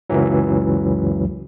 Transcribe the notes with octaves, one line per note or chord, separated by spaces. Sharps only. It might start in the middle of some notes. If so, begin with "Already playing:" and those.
C#2 F#2 E3 F#3